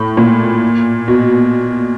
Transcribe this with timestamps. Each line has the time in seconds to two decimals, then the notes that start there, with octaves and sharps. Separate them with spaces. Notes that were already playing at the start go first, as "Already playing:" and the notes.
Already playing: A2
0.17 A#2
1.08 B2